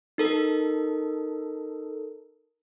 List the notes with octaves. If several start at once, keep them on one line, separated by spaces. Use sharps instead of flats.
D#4 A4 A#4